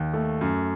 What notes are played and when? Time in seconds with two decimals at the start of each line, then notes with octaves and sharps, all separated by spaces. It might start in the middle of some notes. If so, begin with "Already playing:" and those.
Already playing: D#2
0.14 A3
0.41 F#2